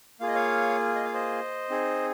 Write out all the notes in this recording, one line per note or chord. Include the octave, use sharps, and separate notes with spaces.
A#3 F4 G#4 F5
D#5
C#5 F5
D#5
F5
C5 D#5
C4 D#4 G#4